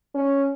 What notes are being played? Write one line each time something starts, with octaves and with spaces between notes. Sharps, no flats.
C#4